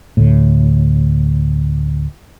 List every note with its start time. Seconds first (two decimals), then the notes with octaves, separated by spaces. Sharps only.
0.17 D2 A2